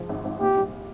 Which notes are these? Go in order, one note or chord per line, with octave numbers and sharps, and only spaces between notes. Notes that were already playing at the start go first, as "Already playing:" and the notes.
Already playing: G#2 F3
G#1
G#1
A#2 G4
G3